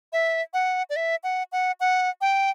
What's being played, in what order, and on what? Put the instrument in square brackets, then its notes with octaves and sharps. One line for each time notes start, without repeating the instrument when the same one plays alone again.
[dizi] E5
F#5
D5
E5
F#5
F#5
F#5
G5